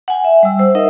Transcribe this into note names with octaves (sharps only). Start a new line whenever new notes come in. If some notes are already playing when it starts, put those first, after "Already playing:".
F#5 G#5
E5
G3 E6
C5
D#4 A#4 D#5 E5 F#5